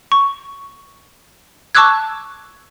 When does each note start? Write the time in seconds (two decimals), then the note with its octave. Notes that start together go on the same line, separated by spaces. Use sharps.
0.12 C#6
1.75 A5 C#6 D6 E6 F#6 G#6